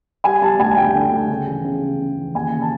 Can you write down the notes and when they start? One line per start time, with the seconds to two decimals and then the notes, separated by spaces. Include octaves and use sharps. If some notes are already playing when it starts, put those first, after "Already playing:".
0.24 G3 G#5
0.41 G3 A5
0.59 D2 G#5
0.76 D2 G5
0.95 D3
1.12 D2
1.30 C#3
1.47 E3
1.64 C#3
1.83 C#3
1.99 C#3
2.17 E3
2.34 D#2 G#5
2.53 C#3
2.62 A5